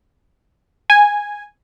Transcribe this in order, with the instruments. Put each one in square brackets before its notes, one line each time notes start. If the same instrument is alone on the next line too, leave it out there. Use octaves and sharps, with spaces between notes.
[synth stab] G#5